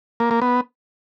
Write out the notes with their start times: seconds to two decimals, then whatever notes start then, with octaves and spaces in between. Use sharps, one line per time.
0.20 A#3
0.31 A#3
0.42 B3